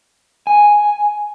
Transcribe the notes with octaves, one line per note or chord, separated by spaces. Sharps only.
G#5